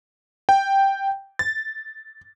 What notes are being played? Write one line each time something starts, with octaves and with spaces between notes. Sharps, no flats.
G5
A6